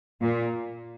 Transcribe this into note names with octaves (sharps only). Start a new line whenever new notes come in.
A#2